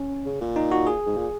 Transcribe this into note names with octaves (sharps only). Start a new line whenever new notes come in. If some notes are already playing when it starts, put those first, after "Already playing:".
Already playing: C#4
C#3
A#2
D#4
F#4
G#4
G#2
A#2